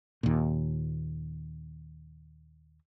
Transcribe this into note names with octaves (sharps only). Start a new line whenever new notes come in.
D#2 A#2